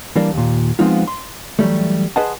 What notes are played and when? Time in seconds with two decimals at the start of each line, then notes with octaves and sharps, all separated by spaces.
0.16 E3 G3 A#3 D4
0.34 D#2 A#2
0.79 F3 G#3 B3 C4 D#4 F4
1.07 C6
1.59 E3 F#3 G3 A3
2.16 G#4 B4 C5 D#5 F#5 A5